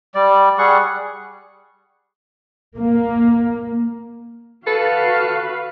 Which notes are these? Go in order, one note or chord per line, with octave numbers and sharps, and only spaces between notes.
G3 D5
G3 G#4 F#5 C#6
A#3
F#4 A4 B4 F5